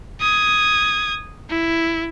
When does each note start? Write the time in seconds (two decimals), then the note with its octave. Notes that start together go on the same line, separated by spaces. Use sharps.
0.21 D#6 G#6
1.50 E4